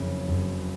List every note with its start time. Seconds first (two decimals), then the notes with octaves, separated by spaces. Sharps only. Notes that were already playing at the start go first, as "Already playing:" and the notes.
Already playing: F#1 F2 C#3
0.28 F#1